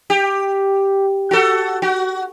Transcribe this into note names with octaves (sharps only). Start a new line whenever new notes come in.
G4
F#4 A4
F#4